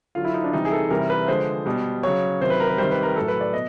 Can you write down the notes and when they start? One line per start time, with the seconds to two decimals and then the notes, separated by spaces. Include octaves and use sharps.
0.15 D3 F#3 F4
0.25 E4
0.34 D#4
0.44 D4
0.53 C3 E3 G3 D#4
0.65 G#4
0.72 A4
0.90 C3 E3 G3 A#4
1.10 B4
1.28 D3 F3 G#3 C5
1.66 B2 G3
2.03 C#3 F#3 C#5
2.41 C3 D#3 F#3 C5
2.50 B4
2.60 A#4
2.69 B4
2.78 C3 D#3 G3 C5
2.91 B4
3.03 A#4
3.16 A2 F#3 A4
3.28 B4
3.41 D5
3.53 B2 D#5